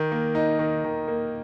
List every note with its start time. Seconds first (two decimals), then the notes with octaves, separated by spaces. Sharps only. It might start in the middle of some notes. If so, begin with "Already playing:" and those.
Already playing: D#3
0.12 A#3
0.35 D#4
0.59 D#3
0.84 D#3
1.08 A#3